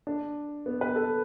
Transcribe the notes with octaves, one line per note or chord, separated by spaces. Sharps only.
D4
B3
B4
A4